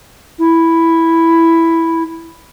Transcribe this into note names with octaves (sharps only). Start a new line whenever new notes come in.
E4